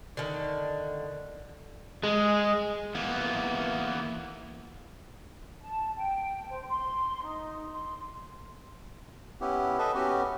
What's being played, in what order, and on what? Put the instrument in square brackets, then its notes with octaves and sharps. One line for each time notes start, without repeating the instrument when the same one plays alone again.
[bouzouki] D3 D#3
[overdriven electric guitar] G#3
[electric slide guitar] E3 A#3 B3
[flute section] A5
G5
C5
C6
D#4
C6
[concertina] B3 C#4 E4 G4
A4 B4 D#5 E5
B3 C#4 F#4 G4